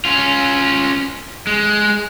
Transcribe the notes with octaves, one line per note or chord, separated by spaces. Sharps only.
C#4 F4
G#3